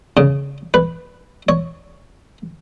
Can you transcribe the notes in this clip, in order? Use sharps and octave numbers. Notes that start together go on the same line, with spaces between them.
C#3
B4
C#5